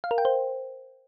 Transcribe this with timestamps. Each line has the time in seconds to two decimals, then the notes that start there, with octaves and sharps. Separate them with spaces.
0.04 F5
0.11 A#4
0.18 G5
0.25 C5